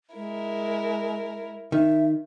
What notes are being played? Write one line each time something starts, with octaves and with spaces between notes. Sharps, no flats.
G#3 E4 A#4
D#3 E5